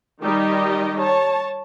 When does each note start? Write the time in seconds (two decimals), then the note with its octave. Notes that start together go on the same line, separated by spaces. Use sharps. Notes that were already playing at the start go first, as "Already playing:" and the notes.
0.22 D#3 G3 D#4 G4 D#5
1.00 C#5 A5